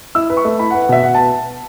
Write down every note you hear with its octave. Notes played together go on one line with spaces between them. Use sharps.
E4 E6
B4
C#6
A3
E4 B5
F#5
B4
F#5
B2 E5
B2 F#5
B4 A5